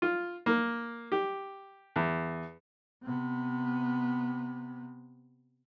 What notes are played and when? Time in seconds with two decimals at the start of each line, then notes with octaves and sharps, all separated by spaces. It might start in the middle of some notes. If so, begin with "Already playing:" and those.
0.02 F4
0.46 A#3
1.12 G4
1.96 E2
3.03 C3 B3